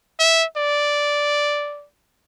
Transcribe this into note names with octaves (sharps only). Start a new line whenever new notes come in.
E5
D5